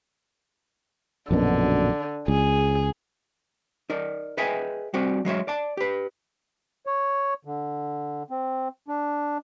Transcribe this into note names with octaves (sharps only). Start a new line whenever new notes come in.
A#1 F#2 B2 D3
C#2 G#4
D#4 A#4 D5
G#4 B4 D#5 E5 G5 G#5
G3 C4 F#4 D5
F#3 G#3 C#5 E5
D5 A5
G4 B4
C#5
D3
C4
D4